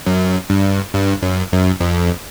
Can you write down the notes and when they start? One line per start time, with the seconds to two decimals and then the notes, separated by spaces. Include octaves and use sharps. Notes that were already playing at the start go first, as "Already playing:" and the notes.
0.06 F#2
0.50 G2
0.94 G2
1.22 F#2
1.52 F#2
1.80 F2